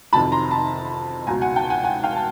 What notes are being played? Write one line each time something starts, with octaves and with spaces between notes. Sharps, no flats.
F2 C3 D#3 F#3 A5 B5
A#5 C6
A5 B5
C#2 B2 F#3 G#5 A#5
F#5 G#5
G5 A5
F#5 G#5
F#5 G#5
F5 G5
A5